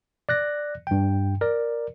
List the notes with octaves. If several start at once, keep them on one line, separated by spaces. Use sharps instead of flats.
D5 F#6 A#6
G2 G5
A#4 D5